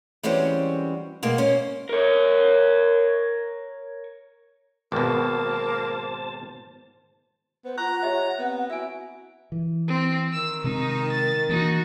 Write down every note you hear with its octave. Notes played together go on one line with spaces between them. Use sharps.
E3 G3 G#3 C4 C#4 F#4
B2 G#3 A#3
C#4 C5
A#4 C#5
G#1 B2 A#3 C5 A5
B3 C5
F4 F#5 A#5 C#6
G4 C#5 D#5 E5
B3 C4
E4 F#4 E5 G#5
E3
C4
D#3 E6
C3 G#3 C4 D#4
A6
E3 A#3 D4 D#4 F#4